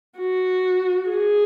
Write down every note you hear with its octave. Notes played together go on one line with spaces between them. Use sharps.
F#4
G#4